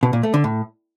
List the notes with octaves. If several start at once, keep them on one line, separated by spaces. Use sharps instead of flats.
B2
A#2
A3
D3
A2